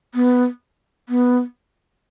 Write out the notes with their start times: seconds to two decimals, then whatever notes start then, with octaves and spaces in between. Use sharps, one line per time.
0.15 B3
1.09 B3